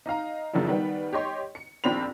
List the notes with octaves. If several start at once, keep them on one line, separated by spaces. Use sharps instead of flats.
D#4 D#5 F5 A#5
F#2 C#3 F3 A#3 D4 E4
D#3 G3 B3
G4 C#5 D#5 C6 C#6
C#7
A#1 D#2 C4 D4 B5 F7